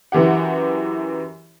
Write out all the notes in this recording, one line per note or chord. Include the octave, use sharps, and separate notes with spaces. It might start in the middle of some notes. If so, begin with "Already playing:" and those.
F#2 E3 G4 F#5